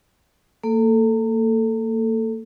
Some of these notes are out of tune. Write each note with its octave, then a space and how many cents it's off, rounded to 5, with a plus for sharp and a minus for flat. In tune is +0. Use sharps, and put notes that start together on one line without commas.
A#3 -35 A4 +0